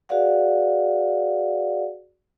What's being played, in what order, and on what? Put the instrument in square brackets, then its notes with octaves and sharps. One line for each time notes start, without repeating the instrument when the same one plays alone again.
[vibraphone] F#4 G#4 B4 D5 F5 F#5